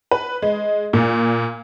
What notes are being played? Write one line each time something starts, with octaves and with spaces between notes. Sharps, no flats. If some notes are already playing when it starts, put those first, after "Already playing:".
B4
G#3
A#2